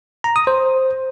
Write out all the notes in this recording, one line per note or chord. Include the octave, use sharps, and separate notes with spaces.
A#5
D#6
C5